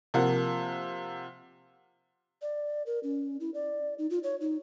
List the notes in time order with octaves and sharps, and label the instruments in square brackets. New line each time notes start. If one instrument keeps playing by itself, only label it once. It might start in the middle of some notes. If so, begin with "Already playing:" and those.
[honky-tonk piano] C3 F3 A#3 F5 F#5
[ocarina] D5
A#4
C#4
E4
D5
D#4
F4
C#5
D#4